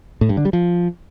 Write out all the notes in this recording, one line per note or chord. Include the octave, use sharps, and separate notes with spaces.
A2
G2
D3
G3
F3